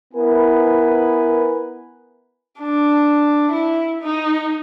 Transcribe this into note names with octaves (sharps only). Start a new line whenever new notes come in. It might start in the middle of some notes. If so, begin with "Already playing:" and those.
B3 E4 A#4 B4 G#5
D4
E4
D#4